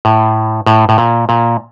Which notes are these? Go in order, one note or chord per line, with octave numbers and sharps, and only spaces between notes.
A2
A2
A2
A#2
A#2